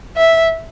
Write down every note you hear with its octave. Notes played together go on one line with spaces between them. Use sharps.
E5